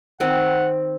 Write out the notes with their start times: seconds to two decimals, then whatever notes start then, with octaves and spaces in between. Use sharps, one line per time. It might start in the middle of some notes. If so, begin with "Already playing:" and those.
0.20 D#3 C4 F#5